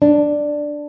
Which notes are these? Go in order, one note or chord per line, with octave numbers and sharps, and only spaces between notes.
D4